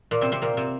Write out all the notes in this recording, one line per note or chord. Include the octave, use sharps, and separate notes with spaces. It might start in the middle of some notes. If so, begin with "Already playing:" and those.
A#2 A#3
C3 C4
C3 C4
A#2 A#3
C3 C4